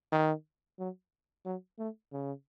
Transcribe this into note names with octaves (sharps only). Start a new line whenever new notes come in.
D#3
F#3
F#3
A3
C#3